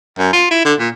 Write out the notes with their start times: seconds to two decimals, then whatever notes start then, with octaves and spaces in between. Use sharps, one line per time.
0.19 F#2
0.33 F4
0.51 E4
0.65 D3
0.79 A#2